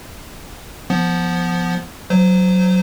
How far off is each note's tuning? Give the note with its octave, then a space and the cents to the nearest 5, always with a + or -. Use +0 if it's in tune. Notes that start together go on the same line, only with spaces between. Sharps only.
F3 +0 B3 +0
F#3 +0 C5 -25